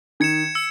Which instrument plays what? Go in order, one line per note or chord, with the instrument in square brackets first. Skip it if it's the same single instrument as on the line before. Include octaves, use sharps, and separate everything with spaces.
[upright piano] D#3 [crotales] G#6 C#7 E7
[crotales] E6 C#7